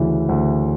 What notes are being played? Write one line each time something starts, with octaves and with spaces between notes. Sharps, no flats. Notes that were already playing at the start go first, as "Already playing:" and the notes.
Already playing: D2 C#3 E3
D2